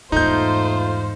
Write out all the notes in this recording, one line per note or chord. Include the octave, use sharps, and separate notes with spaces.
E2 G#2 A3 D#4 F4 C5 G6